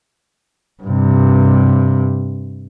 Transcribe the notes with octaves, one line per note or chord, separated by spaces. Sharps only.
G2 C3